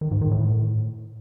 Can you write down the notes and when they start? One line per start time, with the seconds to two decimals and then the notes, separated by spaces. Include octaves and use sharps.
0.01 D#3
0.11 G#2
0.21 D#3
0.31 A2